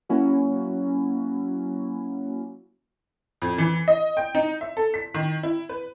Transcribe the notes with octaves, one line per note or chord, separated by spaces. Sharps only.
F#3 A#3 C#4 E4 F#4
F2
E3
D#5
G5
D#4
E5
A4
B6
D#3
E4
B4